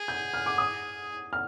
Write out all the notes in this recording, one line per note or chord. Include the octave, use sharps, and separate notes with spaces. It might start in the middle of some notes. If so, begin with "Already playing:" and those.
Already playing: G#4
G6
F6
D6
D#6
F6